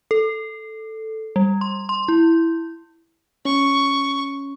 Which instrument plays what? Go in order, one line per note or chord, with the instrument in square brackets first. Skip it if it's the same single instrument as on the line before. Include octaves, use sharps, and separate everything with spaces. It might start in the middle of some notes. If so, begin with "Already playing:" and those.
[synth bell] A4
G3
C6
C6
E4
[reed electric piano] C#4 [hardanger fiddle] C#6